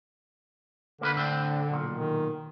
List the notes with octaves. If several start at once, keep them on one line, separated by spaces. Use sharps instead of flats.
D3 A#3 E4 B4
A2 C4 D4
B1 A#2
D#3